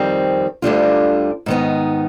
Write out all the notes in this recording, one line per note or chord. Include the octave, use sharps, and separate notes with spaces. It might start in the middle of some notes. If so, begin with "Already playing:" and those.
Already playing: F2 D#3 G3 C4
D2 D3 G3 D4 F4
G#2 D#3 B3 D#4